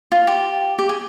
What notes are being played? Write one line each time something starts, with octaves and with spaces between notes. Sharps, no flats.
F4
G4
G4
G#4